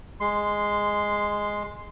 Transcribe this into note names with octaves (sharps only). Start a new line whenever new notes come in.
G#3 C6